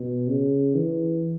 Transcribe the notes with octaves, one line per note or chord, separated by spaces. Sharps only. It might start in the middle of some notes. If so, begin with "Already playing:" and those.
Already playing: B2
C#3
E3